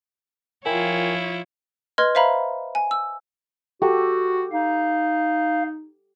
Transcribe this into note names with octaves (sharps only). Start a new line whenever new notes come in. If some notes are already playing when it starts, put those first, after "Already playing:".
F3 E4 F4 A#4 C#5 G5 G#5
B4 D#5 C6 F6 G#6
C5 E5 F5 A#5 B5
G#5
E6
F#4 G4 A4 F#5
D#4 F5